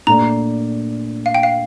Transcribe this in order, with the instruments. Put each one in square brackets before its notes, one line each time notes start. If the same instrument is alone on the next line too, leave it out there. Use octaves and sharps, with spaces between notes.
[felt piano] A#2 A3 D4 A4 D5 [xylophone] A#5
[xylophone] F5
G5
F5